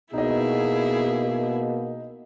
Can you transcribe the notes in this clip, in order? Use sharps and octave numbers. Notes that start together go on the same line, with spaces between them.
B2 A#3 D#4 E4 G#4 D#5